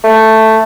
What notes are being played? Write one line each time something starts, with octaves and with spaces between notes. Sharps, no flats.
A3